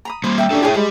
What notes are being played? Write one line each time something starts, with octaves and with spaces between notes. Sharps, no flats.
A#5 B5 D#6
G3 A#3 C5 B5
E5 G5 A#5
C#4 D4 G4 A4
E4 G#4 C#5 E5 G5
G3 G#3 G4 B5